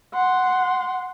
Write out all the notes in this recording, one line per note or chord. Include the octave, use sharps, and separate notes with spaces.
F#5 C6